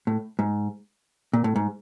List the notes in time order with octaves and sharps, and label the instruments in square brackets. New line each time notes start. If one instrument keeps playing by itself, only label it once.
[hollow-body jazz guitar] A2
G#2
A#2
A2
G#2